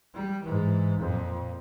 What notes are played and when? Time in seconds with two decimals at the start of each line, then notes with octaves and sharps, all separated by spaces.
0.14 G3
0.44 G#2 E3
1.00 F2 A#2